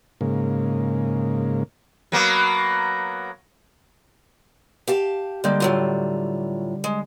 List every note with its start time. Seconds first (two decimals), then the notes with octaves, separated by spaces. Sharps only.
0.21 G#2 C#3 A#3
2.12 F#3 A#3 B3
4.87 G4 F5 A5
5.44 D3 G3 G#3 A#3 G6
5.60 A2 F#3 F4
6.84 G#3